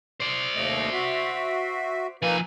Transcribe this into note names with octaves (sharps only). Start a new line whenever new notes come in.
C5 D5
D#2 A3 D#5
F#4 E5
F3 A#3 D#4 B4 G#5